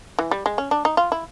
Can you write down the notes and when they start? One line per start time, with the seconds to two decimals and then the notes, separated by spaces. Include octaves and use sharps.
0.19 E3
0.31 G3
0.46 G#3
0.58 C#4
0.71 D4
0.85 D#4
0.97 F4
1.12 E4